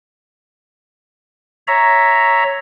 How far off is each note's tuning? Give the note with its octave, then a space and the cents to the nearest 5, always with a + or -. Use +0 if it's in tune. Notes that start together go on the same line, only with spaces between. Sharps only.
C#5 +0 E5 +0 A#5 +0